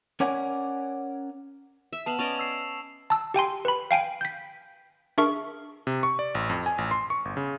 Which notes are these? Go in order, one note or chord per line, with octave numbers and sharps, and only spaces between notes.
C#4 A#4 C#5 D5 F#5 G#5
E5
B3 F5 A5 E7 F#7
C#4 D5 D#5 C#6 F7
E6 C7 E7
A5 E6
G4 G5 G#5 C6
B4 B5
F5 G5 G#5 D7
G6 B6
D4 G#4 A#4 E5 C#6
C3
C#6
D5
A1
F2
G#5
A1
C6
C#6
G1
C#3